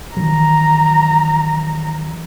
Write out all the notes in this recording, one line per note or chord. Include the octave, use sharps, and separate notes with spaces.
D#3 E3 F#3 A#5